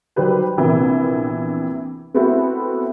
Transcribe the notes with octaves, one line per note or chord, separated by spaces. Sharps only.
D#3 F#3 G3 G4 B4 C5
A#1 C3 E3 A#3 B3
A3 B3 C4 E4 F#4 A4